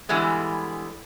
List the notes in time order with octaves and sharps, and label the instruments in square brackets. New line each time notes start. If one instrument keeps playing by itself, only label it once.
[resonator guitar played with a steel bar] D3 E3 G3 G#3 B3